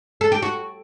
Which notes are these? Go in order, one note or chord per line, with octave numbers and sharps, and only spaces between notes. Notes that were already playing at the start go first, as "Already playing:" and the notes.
A4
G4
F#4